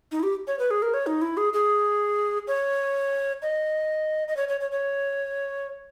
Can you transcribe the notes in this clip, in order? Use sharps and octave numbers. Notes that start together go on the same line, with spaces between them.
D#4
E4
G4
C#5
B4
G#4
A#4
C#5
D#4
E4
G#4
G#4
C#5
D#5
D#5
C#5
C#5
C#5
C#5